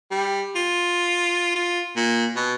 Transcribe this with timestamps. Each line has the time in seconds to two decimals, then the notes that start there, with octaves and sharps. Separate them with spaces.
0.11 G3
0.56 F4
1.55 F4
1.96 A#2
2.36 B2